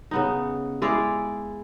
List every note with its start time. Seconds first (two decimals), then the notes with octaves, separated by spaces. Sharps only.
0.11 C#3 B3 D#4
0.82 G#3 E4 D5 F5